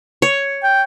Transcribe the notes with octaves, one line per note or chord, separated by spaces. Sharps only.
C#5
G5